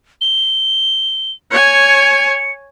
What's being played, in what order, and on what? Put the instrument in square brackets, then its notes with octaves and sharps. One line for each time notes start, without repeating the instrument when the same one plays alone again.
[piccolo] G7
[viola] C#5 G#5 [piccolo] C#7